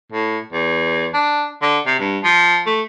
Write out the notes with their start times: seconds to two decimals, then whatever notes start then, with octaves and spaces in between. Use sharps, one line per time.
0.12 A2
0.52 E2
1.14 D4
1.62 D3
1.86 C3
1.99 G2
2.24 F3
2.66 A3